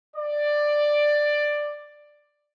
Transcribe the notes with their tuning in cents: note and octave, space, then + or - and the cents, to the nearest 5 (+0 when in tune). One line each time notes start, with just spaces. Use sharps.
D5 +10